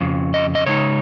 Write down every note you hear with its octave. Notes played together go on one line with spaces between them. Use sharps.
F2 C#3
D#5
D#5
C#3 G#3 D#4 C#5